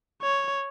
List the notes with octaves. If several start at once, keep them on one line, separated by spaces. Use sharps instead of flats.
C#5